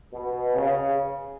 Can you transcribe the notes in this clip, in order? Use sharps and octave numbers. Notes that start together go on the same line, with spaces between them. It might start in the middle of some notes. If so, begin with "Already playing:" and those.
B2
C#3